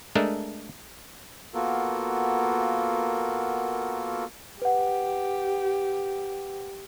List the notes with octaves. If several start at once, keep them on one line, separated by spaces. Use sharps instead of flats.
G#3 A3 D4 A4 A#4
A#3 B3 F4 F#4 A4 A#4
G4 B4 F#5